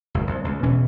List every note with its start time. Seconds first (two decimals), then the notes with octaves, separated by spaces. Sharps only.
0.14 F#1 C#2
0.27 C2
0.45 C#2
0.63 E1 B2 E3 C#4